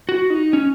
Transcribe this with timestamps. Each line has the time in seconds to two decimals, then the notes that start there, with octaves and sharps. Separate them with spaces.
0.09 F#4
0.30 D#4
0.53 C#4